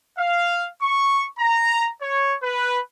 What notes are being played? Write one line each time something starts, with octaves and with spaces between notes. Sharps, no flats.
F5
C#6
A#5
C#5
B4